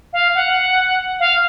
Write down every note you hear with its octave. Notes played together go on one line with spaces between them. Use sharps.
F5
F#5
F5